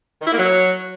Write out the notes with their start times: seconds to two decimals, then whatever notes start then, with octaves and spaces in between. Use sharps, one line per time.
0.21 D#3
0.27 E4
0.32 A#3
0.38 F#3